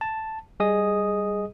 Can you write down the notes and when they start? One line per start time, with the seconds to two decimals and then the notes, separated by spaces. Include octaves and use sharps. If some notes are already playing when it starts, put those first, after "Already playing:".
0.01 A5
0.60 G3 G#4 D#5 D#6